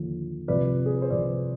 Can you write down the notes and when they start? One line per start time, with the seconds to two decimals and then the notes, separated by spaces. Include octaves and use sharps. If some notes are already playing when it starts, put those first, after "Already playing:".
Already playing: D#2 D3 F3
0.48 C2 C3 F3 B4 D5
0.86 G#4
0.94 B4
1.02 C5
1.10 C2 C3 F3 B4 D5